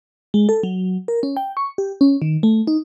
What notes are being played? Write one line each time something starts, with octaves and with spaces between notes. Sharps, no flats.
G#3
A4
F#3
A#4
C#4
G5
C#6
G4
C#4
D#3
A3
D#4